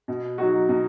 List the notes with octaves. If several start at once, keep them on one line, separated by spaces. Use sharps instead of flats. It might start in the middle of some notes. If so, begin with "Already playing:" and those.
B2
F#3 D#4 F#4
B2